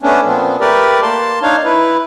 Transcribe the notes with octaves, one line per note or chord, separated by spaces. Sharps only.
A3 B3 C#4 D4
A#2 F3 B3 C4
A3 G4 A#4 B4 D5
A#3 A5 C6
D4 D#4 C#5 F5
E4 B4